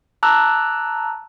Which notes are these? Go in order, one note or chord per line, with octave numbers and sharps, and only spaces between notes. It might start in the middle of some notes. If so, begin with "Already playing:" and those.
A5 A#5 D6 E6 F#6